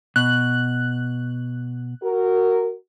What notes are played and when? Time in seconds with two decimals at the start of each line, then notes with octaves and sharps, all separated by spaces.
0.16 B2 F#6
2.03 F#4 A#4